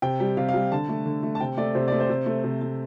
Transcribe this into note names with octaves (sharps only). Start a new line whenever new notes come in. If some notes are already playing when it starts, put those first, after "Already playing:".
C3 G5
G3
C3 F5
F5
G3
D3 A5
A3
D3
A3
A5
C3 G5
A3 D5
C3 C5
A3 D5
C5
C3
A3
C3
A3